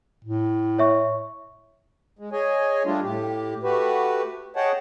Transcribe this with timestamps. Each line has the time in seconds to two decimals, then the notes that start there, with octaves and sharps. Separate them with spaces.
0.25 A2
0.79 C#5 E5 C#6
2.19 G#3
2.32 G#4 C#5 D#5 G#5
2.85 G3 A3 D4 F4
3.03 A2 G4
3.63 A3 F#4 G4 B4
4.56 G#4 C#5 D#5 F#5 G5 A5